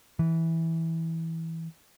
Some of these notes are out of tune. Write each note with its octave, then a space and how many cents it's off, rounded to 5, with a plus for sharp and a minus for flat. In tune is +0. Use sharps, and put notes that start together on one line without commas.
E3 -10